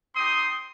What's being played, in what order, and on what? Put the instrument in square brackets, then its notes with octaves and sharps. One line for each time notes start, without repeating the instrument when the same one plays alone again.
[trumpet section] C4 D#4 G4 C6 D#6